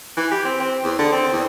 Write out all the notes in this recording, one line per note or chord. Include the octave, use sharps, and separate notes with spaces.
E3
G4
C4
C4
E2
D3
C4
E2